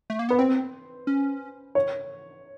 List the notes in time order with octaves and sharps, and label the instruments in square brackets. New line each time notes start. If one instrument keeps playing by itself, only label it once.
[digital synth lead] A3
A#3
[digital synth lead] B3 [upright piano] B4
[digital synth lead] C4 [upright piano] C5
[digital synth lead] C#4
[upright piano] C#5